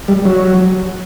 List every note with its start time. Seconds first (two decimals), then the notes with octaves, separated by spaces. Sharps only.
0.08 G3
0.25 F#3